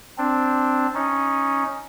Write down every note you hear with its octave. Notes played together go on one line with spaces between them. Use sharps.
C4 D4
C#4 D#4